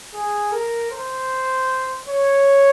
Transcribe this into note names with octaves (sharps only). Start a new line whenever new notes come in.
G#4
A#4
C5
C#5